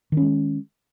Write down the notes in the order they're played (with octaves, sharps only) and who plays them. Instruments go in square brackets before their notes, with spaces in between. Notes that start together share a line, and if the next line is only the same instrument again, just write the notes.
[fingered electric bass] D#3
C#4
G#3